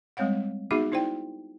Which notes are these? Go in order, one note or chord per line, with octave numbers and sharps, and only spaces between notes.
G3 G#3 C4 C#5 F5 F#5
B3 D#4 F#4 G#4 E5 D6
D#4 E4 C5 D5 G5